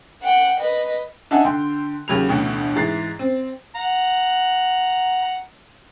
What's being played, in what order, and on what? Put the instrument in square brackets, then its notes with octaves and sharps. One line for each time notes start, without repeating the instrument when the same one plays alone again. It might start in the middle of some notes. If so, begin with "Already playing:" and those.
[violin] F#5 G5
B4 D#5
[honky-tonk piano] D4 D#4 D#5 E5 F#5 G#5
D3 G5 C6
D#2 C#3 F#3 G4 B5 F7
A1 D2 B2 G5
G#2 E3 A#5 A6 C7
C4
[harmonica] F#5 A#5